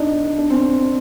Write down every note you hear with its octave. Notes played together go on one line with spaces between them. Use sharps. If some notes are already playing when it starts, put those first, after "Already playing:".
Already playing: D4 D#4
D4
C4